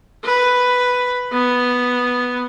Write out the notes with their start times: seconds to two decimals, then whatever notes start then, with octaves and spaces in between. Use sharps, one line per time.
0.25 B4
1.33 B3